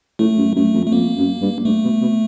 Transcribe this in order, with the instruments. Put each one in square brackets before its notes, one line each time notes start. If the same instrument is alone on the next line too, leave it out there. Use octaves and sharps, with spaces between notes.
[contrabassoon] A2 [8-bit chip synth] A3
[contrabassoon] F#2
[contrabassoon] F#2 [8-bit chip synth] A3
[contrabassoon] F2
[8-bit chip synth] A3
[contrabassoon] F2 [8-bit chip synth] A#3
[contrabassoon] F#2
G2
[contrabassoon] G2 [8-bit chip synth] A3
[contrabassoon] B2
B2